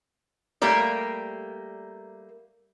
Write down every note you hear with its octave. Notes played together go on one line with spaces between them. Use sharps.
G3 A3 A#3 A#4 D5